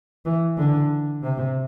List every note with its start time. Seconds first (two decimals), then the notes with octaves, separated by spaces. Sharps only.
0.26 E3
0.57 D3
1.23 C3